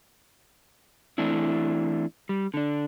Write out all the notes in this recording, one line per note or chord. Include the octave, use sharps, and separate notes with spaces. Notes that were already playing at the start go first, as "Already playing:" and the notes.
E3 A3 C4 D4 E4
G3
D3 D4